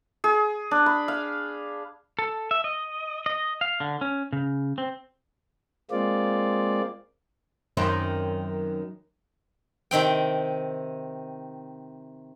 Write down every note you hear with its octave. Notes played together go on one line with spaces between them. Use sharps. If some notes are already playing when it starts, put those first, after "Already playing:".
G#4
D4
B5
F5
A4
E5
D#5
D#5
F5
D3
C#4
C#3
C4
G#3 A#3 C4 F4 D5
F#2 D#3 C4
C3 D#3 C4 G5